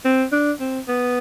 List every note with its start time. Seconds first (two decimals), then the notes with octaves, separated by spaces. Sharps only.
0.05 C4
0.32 D4
0.60 C4
0.88 B3